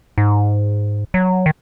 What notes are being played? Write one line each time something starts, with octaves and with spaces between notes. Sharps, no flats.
G#2
F#3
D#3